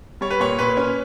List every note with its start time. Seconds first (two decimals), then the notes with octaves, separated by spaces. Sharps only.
0.21 G3 C#5
0.31 B4
0.40 A#2 C#5
0.59 A#2 B4
0.77 C#4